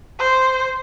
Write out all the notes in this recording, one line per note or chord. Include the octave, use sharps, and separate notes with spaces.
C5